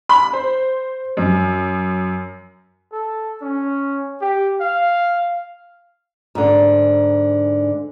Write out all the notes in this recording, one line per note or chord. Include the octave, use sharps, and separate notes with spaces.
B5
C5
F#2
A4
C#4
G4
F5
G#2 D3